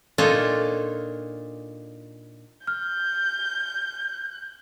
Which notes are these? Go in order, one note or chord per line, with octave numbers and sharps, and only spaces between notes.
A#2 D4 D#4 F4 A4 C#5
F6 G6